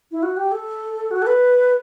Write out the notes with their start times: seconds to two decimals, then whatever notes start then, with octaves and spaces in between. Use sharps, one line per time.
0.12 E4
0.23 F#4
0.37 G4
0.52 A4
1.11 F#4
1.22 A4
1.27 B4